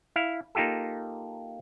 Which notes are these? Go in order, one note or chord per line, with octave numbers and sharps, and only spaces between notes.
E4 F5
A#3 D#4 F4 G4 A4